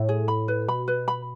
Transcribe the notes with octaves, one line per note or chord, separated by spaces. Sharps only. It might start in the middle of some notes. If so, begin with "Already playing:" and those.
Already playing: A2
G#4
B5
B4
B2 B5
B4
B5